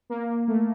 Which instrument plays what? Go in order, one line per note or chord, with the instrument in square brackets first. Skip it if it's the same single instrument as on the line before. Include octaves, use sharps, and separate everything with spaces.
[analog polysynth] A#3
A3